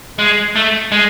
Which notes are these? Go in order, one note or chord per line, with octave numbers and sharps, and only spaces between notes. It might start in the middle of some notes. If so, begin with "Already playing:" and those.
G#3
A3
G#3